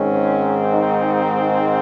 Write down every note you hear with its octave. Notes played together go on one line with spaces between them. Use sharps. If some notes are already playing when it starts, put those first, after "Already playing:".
Already playing: G#2 D#3 G#3 C4 C#4
D#4